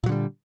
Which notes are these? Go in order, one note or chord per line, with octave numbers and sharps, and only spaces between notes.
A#2 D3 F#3 G3